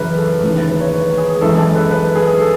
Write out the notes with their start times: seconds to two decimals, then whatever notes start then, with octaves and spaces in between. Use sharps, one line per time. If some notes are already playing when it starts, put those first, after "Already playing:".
Already playing: F#2 C#3 E3 B4
0.18 A4
0.43 D#2 C#3 E3
0.56 B4
0.68 B4
0.80 C#5
0.93 B4
1.18 G#4
1.41 F#2 E3 G#3 A4
1.58 A4
1.75 B4
1.91 B4
2.16 G#4
2.41 A4